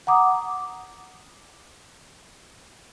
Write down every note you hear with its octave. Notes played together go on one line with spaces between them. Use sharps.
F#5 A#5 D6 D#6